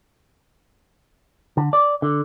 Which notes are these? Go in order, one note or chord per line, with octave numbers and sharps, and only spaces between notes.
D3
D5
D3